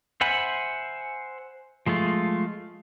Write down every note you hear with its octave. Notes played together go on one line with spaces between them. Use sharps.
C5 E5 F#5 G#5 B5
F3 G#3 A3 F4